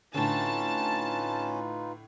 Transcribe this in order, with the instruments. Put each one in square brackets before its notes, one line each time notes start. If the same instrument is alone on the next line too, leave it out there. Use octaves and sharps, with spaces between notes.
[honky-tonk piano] A2 D3 [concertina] C#4 [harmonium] D#4 F4 B4 [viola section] A5